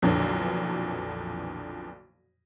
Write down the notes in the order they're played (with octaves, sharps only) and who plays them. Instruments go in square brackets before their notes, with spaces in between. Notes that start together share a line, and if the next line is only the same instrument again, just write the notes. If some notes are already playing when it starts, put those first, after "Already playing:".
[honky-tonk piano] B1 F2 A#2 D3 E3 F#3